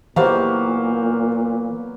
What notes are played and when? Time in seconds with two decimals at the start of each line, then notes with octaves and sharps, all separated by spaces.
0.16 A#2 E3 F#3 A#3 B3 G4 C5 F5